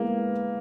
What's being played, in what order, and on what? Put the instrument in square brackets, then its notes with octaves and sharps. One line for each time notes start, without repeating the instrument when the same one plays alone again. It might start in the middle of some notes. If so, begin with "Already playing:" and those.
Already playing: [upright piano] G#3 B3 E4 [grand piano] A#3